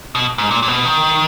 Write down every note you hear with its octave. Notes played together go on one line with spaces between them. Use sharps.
B2
G#2
A#2
A#2
B2
D#3